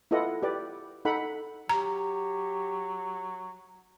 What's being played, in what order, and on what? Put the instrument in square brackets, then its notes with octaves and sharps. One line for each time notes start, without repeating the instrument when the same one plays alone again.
[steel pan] E4 F4 A4 B4 D#5 F#5
G4 B4 D5
D#4 A4 F#5 B5
[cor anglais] F#3 [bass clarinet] G4 [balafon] A#5